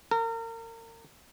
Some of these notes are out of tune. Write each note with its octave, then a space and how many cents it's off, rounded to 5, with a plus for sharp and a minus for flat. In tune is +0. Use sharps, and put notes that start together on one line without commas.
A#4 -35